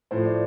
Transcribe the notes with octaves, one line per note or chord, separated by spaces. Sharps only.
A2 F3 C5
D5